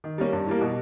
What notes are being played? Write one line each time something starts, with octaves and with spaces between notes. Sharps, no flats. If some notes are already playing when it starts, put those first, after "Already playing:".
D#3
G3 A#3 C#4
G2
E3 G3 A#3
B2